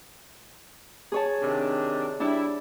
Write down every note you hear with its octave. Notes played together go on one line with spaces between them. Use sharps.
G#4 C#5 A5
C3 D#3 D4
G3 D4 E4